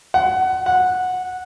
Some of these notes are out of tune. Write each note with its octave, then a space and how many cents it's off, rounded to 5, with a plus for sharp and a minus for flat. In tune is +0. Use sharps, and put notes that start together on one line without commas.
F#5 +20
F#5 -10